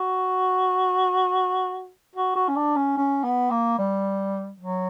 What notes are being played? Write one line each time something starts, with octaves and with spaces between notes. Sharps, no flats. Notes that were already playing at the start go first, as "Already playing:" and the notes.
Already playing: F#4
F#4
F#4
C#4
D4
C#4
C#4
B3
A#3
G3
F#3